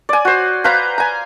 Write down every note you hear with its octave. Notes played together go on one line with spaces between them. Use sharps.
D5 G#5
F#4 C5
B4 C5 F5 A#5
G#5 A#5